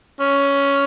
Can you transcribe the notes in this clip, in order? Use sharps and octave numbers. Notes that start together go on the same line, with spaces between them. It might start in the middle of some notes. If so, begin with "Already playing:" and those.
C#4